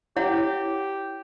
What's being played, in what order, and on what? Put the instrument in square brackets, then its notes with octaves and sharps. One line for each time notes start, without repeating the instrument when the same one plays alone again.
[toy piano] E4 C#5 F#5 [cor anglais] G4